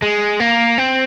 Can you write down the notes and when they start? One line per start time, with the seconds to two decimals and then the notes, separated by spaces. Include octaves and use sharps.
0.02 G#3
0.40 A#3
0.78 C4